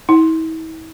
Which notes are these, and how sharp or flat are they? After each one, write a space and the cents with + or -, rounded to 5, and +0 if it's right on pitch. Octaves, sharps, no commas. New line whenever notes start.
E4 -45